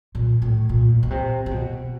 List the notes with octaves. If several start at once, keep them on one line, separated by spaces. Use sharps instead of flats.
A#2
A2
A#2
B2
C3
C3
B2